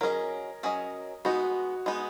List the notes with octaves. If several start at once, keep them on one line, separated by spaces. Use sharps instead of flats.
F#3 C#4 G#4 A#4 D#5
F#3 C#4 G#4 D#5
G#3 B3 D#4 F#4
G#3 B3 D#4